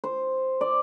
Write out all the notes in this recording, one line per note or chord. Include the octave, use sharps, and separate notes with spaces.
C5
D5